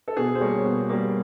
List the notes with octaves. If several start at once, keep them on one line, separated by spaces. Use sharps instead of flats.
A4
B2 G#4
C5
G3 A#3 C#5
B2
G3 A#3